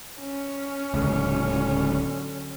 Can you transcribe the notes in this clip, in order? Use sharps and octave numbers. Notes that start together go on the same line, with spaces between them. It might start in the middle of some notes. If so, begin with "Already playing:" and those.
C#4
D1 C#2 D3 F#3